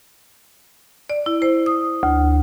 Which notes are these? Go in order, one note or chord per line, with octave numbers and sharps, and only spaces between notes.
D5
E4
C5
D#6
D2